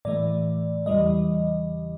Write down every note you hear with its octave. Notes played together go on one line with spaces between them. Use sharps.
A2 E3 A3 D5
E2 C#3 E3 G3 D#5